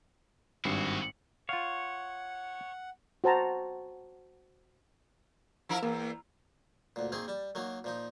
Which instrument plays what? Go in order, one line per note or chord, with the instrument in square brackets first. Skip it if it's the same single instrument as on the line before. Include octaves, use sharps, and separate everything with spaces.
[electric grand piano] G#1 G2 C7 [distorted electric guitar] E4 F#4
[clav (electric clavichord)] F4 F5 [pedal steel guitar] C#5 [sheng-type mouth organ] F#5
[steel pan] F#4 C5 A5 A#5
[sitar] F3 E4 A#4
[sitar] E2 [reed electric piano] A#3
[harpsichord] D2 A#2
D#3 A#3 C4 G#4
G3 A5
D#3 F#3 A#3
A#2 F3 D#4